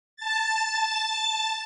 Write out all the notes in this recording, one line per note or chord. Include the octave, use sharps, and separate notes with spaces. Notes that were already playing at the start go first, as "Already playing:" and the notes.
A5 A6